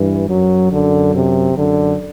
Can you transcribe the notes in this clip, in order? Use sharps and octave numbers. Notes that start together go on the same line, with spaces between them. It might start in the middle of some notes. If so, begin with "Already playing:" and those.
Already playing: G2 E3
F#2 F#3
F#2 D3
C3
F#2 D3